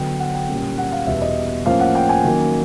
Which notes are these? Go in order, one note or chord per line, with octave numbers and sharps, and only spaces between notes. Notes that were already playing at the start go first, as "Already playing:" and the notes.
Already playing: D3 F#3 B3 G5
F#5
G5
A#2 G3 A#3 C#4
F#5
F5
E2 B2 G3 B3 E5
D#5
A2 F3 A#3 C#4 F5
F#5
G5
G#5
D#3 F#3 A#3 C#4